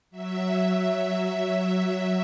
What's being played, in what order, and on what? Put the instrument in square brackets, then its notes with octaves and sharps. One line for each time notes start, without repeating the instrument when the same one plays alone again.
[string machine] F#3 E5